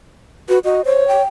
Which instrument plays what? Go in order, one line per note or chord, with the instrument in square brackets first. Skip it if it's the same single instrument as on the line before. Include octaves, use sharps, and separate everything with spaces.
[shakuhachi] F#4 [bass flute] B4
[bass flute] F#4 [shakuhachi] D#5
[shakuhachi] C5 [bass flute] C#5
[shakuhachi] G5